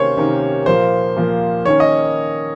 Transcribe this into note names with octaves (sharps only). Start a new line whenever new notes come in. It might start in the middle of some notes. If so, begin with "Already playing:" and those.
Already playing: C3 D#3 A#3 C#4 C5 C#5
C3 D#3 A#3 C#4
A#2 F3 A#3 C5
A#2 F3 A#3
D#3 A#3 C#4 C#5
D#5